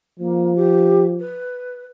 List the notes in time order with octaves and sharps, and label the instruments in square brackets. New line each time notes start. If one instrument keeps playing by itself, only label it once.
[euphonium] F3 [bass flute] A#3
[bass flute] G4
B4